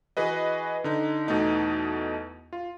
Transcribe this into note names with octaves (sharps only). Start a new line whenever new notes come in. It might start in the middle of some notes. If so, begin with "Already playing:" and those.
E3 F#4 G#4 B4 D#5
D3 D#4
E2 B2 A3 D#4
F4